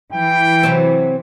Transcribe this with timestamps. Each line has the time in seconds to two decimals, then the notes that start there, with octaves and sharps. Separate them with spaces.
0.13 E3 G5
0.63 C3 F#3 C4